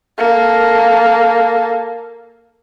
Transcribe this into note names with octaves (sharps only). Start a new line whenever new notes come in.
A#3 A4